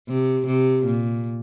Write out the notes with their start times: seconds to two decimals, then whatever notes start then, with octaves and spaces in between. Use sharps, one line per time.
0.08 C3
0.47 C3
0.86 A#2